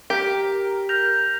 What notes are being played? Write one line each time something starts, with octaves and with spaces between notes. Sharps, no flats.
G4 A#4 B6
F6 G6 A#6 F7